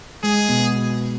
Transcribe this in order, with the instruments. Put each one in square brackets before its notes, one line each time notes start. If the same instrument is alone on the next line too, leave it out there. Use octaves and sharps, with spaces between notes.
[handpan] G#3 [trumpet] G#4
[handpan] B2 B3